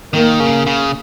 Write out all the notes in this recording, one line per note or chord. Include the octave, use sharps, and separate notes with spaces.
D#3 A#3
C#3
C#3